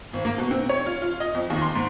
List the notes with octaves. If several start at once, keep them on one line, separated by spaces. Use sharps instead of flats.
G#1
A#3
B2
C4
C#5
F4
F4
D#5
F2
D#2
C6
G#2